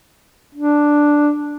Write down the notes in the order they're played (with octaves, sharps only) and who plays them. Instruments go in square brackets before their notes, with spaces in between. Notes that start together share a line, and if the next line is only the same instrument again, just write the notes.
[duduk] D4